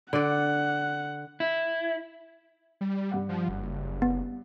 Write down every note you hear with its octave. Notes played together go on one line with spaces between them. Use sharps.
D3 D5 F#5
E4
G3
G2 F#5
F3
F#1
B3